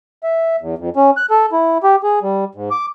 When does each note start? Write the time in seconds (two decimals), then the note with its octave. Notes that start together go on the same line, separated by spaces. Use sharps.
0.23 E5
0.61 E2
0.78 F2
0.96 C#4
1.17 F#6
1.30 A4
1.52 E4
1.83 G4
2.03 G#4
2.22 G3
2.55 G#2
2.71 D6